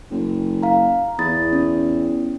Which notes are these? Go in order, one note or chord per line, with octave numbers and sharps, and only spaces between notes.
F#1
F5 A#5
E2 B5 D#6 A6
C#4